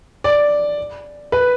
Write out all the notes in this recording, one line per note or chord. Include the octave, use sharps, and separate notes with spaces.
D5
B4